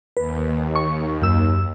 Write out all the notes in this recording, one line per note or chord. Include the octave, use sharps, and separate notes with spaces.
D#2 B4
C#6
F#2 E6